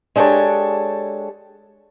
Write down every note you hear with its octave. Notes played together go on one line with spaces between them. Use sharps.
G#3 D4 G4 A4 C#5